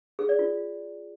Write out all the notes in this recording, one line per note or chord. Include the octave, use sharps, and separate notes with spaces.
G#4
D5
F4